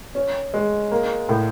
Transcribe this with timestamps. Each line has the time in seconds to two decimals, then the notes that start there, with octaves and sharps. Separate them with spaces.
0.15 C#4
0.54 G#3
0.91 A#3
1.29 A2